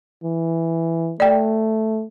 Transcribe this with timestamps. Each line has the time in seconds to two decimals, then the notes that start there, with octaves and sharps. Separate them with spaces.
0.23 E3
1.20 A3 D5 G5